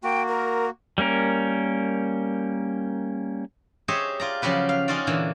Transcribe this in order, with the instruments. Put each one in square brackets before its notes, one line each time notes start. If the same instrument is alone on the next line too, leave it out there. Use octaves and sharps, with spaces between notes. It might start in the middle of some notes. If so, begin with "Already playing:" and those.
[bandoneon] A#3 F#4 [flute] G5
[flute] A#4
[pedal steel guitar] G3 A#3 C#4 A#4
[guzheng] G4 G#4 C5 C#5 D#5 E5
F4 D5 A#5
C#3 F3 F#3 G4 B4
F5
C#4 D#4 F4 F#4 D5
A#2 D3 E3